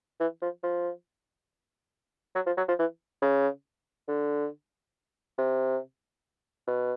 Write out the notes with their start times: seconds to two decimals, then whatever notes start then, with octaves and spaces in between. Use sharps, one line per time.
0.20 E3
0.42 F3
0.63 F3
2.35 F#3
2.46 F3
2.57 F#3
2.68 F3
2.79 E3
3.22 C#3
4.08 D3
5.38 C3
6.67 B2